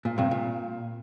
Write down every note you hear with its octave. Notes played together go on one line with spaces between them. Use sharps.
A#2
G2 C3
A#2